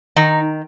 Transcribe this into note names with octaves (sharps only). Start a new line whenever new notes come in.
D#3 D#4